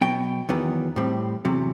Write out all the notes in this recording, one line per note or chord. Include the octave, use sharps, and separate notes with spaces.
B2 F#3 B3 G5
E2 D#3 F#3 B3
A2 G3 C4
E2 C3 F#3